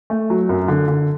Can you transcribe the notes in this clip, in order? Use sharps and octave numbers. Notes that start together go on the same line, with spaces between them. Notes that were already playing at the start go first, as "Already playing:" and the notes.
A3
F#3
F#2
D3
D3